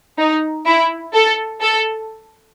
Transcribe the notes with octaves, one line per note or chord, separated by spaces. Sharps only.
D#4
E4
A4
A4